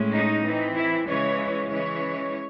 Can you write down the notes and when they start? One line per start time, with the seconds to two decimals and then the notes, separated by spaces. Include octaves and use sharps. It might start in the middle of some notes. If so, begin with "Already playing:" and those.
Already playing: A2 G#3 C#4
0.14 D#4
0.45 E3 C4
0.76 E4
1.08 C#3 E3 G#3 C#4 C#5
1.70 E3 G#3 C#4 C#5